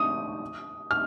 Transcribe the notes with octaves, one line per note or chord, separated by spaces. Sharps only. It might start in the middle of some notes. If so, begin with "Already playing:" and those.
Already playing: D#6
F6